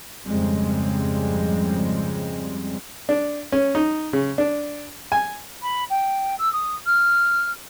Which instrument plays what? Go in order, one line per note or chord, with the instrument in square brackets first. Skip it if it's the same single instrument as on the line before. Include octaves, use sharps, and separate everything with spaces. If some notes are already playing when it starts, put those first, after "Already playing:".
[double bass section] F2 G#2 C#3 G3 G#3 C4
[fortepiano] D4
C#4
D#4
C#3
D4
G#5
[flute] B5
G5
E6
D#6
F6